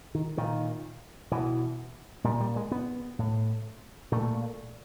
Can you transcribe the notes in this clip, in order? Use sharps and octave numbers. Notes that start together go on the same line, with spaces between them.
D#3
A#2 D#3
B2 E3
A#2 G3
G3
G#3
B3
A2
A#2 A3